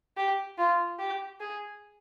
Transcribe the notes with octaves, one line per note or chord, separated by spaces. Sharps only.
G4
F4
G4
G#4